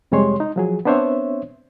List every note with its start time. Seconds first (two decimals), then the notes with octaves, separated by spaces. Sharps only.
0.12 F2 C3 G3 G#3 C#5 C6
0.40 D#4
0.56 F3 F#3 G#4
0.85 B3 C4 D4 C5 C#5 E5